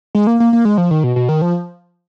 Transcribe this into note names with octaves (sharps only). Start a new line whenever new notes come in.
G#3
A#3
A#3
A#3
G#3
F3
D#3
B2
B2
D#3
F3